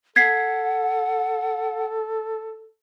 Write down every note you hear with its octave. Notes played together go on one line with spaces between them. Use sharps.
A4 F#5 G#6 B6 C7